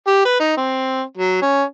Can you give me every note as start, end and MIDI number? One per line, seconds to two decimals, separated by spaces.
0.07 0.21 67
0.25 0.36 71
0.40 0.56 63
0.57 1.02 60
1.17 1.40 54
1.42 1.63 61